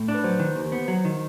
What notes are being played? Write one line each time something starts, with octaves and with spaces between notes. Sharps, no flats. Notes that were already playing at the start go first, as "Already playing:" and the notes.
Already playing: A2
D4
B4
F#3 C5
D#3
D#2
B3
F#3
D#3